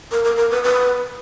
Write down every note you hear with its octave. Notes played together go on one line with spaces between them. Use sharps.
A#4
A#4
A#4
B4
B4